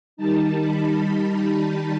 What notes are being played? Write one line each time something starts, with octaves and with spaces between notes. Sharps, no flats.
D#3 G3 D#4 A5
B5